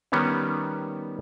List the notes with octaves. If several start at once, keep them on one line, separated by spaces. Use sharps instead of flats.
D#3 G3 B3 C#4